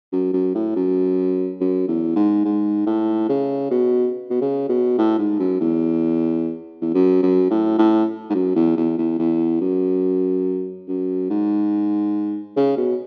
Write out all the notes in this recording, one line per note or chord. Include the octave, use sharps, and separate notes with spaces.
F#2
F#2
A2
F#2
F#2
E2
G#2
G#2
A2
C#3
B2
B2
C#3
B2
A2
G#2
F#2
E2
E2
F#2
F#2
A2
A2
G#2
F#2
E2
E2
E2
E2
F#2
F#2
G#2
C#3
B2